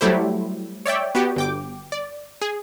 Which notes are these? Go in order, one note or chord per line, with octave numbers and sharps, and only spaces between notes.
F#3 G3 A3 E4 G4 C5
C#5 D5 E5 G5
B3 F#4 G4
G1 G5 D6
D5
G#4